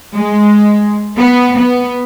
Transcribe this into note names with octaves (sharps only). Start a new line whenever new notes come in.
G#3
B3
B3